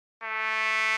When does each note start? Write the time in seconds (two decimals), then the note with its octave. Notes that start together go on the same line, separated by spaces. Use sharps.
0.23 A3